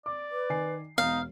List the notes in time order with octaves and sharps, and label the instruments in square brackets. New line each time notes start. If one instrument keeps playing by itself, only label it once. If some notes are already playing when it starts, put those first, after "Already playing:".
[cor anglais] D5 [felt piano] D6
[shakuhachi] B4
[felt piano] D#3 G#5 C7
[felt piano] E1 [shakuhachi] B3 [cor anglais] D#4 [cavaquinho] F5